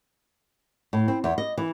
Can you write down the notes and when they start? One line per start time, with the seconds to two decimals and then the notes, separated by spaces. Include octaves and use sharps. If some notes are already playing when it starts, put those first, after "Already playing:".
0.93 A2
1.08 C4
1.24 E2
1.38 D#5
1.58 E3